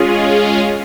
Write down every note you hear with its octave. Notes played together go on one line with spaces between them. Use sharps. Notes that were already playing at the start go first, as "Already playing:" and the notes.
Already playing: G#3 C#4 F4 G#4